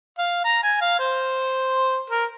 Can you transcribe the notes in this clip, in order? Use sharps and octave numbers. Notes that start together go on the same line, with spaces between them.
F5
A#5
G#5
F5
C5
A#4